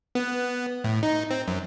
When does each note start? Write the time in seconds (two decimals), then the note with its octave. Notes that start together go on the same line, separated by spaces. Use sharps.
0.15 B3
0.84 A2
1.03 D#4
1.31 C4
1.48 F#2